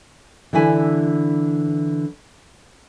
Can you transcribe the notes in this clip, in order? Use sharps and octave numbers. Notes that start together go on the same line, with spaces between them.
D3 E3 D4 E4 G#5